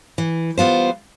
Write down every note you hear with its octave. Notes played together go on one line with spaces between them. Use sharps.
E3
G3 B3 F4 C5